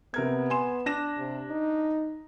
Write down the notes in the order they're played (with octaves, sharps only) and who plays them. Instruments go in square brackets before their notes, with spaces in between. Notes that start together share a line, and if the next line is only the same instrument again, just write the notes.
[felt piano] C3 A#4 G#6 [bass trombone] B3
[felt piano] G#5 C6 E7
D4 A#6 E7
[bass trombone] C3
D#4